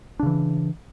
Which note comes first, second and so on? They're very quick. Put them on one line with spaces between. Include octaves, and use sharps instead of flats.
D4 C#3 E3